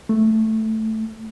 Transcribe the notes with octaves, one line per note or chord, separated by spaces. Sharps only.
A3